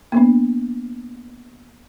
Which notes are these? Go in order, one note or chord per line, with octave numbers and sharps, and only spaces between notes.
A#3 B3 D4